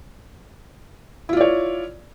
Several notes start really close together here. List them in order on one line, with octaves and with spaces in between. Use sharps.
E4 F4 D5 C#5